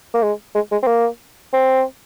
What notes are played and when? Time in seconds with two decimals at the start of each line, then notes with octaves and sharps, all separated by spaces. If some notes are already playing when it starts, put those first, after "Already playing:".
0.14 A#3
0.23 G#3
0.55 G#3
0.72 G#3
0.83 C4
0.87 A#3
1.53 C4